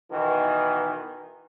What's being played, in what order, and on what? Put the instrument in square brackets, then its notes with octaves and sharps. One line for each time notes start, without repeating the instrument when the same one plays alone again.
[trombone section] B2 D#3 E3